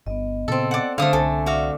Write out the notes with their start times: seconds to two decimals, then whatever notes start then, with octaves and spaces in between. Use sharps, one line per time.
0.06 G1 B3 D#5
0.48 A#2 C#3 C4 A4
0.71 D5 F#5
0.98 D3 A3 C4 A4 C5 F5 D#6
1.13 C2 A4 G#5
1.46 F#4 D5 E5 F5 D6